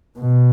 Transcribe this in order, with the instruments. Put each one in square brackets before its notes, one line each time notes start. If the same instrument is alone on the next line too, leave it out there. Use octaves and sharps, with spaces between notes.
[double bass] B2